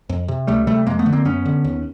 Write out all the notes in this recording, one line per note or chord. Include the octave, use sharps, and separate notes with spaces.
F2
C3
C#2 G3 A3
C3 G3 A3
F2 G#3 A#3
A3 B3
D3
A#3 C4
F#2 B3 C#4
D3
D#2